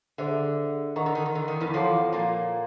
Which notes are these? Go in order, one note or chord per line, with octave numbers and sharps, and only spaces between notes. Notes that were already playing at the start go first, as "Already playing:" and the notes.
D3 G#4 C5 E5
D#3 A#4 D#5 F#5 A#5 C#6
D3
D#3
D#3
D3
D#3
E2 E3
F2 F3 A4 C#5 F#5 A5 D6
A#2 A#3